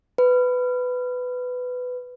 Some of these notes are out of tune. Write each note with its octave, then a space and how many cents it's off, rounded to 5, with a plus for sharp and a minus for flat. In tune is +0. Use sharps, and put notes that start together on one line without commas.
B4 +15